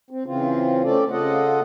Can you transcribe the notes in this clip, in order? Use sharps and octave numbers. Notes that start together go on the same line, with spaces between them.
C4
C#3 E3 C4 F4
A3 C4 C#4 A4 D5
C#3 F4 A4 D#5 F#5